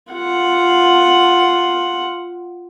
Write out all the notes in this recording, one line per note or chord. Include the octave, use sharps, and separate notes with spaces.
F4 F#5